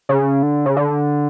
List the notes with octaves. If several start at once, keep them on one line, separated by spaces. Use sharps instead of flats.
C#3
D3
C#3
D3